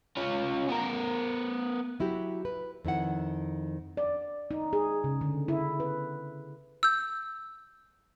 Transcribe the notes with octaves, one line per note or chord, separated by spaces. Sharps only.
C#4 F4
B3 A#4
F#3 E4 F#4 G4
B4
F2 D#3 E4 F#5
D5
D#4
G#4
C#3
D3
E4
B4
E6 G6